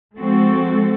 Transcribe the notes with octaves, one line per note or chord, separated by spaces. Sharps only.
F3 G#3 C4 F#4 A4